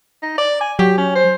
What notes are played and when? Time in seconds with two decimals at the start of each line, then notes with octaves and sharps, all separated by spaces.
0.22 D#4
0.38 D5
0.61 G#5
0.79 F#3 G4
0.98 C#4
1.15 C5